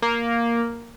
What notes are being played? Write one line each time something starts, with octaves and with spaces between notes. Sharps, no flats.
A#3